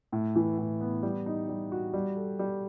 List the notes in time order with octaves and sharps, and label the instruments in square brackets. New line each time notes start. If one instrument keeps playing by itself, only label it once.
[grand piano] A2
E3
A2
B3
G3
D#4
G3
F#4
G3
A4
G3